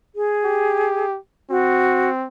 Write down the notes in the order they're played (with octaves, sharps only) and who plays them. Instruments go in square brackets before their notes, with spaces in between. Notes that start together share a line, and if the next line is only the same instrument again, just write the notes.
[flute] G#4
[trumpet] G4
[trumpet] C4 [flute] F#4